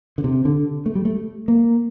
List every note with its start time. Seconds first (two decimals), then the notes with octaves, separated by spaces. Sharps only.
0.18 D3
0.24 C3
0.45 D3
0.86 A3
0.95 G3
1.05 A3
1.48 A#3